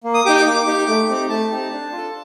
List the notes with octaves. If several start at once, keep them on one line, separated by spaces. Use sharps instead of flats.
A#3
D#6
D#4 G4 D6
D6
A#3
D#4 G4
A3
C4 D#4 G4
A3 A5
C4 D#4 G4
D4
F4
A4